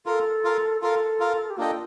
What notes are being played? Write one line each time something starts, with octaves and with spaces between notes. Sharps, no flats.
F4 A4 A#4 F5
F4 A#4 F5
F4 A4 A#4 F5
F4 A#4 F5
G4
A#3 D4 F4 A4 D#5 G5